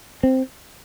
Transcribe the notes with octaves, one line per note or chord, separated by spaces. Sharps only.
C4